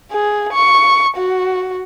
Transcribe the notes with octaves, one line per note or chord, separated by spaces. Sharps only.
G#4
C#6
F#4